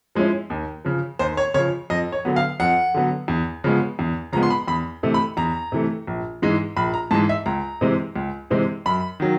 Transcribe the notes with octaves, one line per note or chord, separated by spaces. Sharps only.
F3 G#3 C#4 E4
D#2
C#3 F3
D#2 C5
C#5
C#3 F3 C#5
F2 D#5
C#5
D3 F#3 B3
F5
F2 F#5
D3 F#3 B3
E2
C#3 F3 G#3 B3
E2
C#3 F3 G#3 B3 A#5
C6
B5
E2 B5
C3 E3 A3
B5
E2 A#5
C3 E3 A3
A#1
G#2 E3 G#3
A#1 B5
A#5
G#2 E3 G#3 A5
E5
C#2 A#5
C3 E3 G#3 C4
C#2
C3 E3 G#3 C4
F#2 B5
D#3 F#3